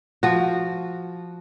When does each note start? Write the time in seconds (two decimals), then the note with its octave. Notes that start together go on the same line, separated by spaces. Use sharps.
0.23 F3 F#4